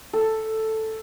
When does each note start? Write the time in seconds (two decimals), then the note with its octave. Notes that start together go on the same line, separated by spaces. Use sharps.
0.13 A4